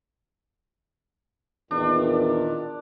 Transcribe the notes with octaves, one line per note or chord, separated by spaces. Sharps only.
E2 A#2 D#3 D4